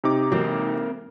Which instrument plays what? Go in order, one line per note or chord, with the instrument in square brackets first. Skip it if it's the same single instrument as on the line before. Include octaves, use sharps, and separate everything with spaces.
[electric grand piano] C3 D#4 D6
[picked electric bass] G#2 E3 F#3 [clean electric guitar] A#3 C4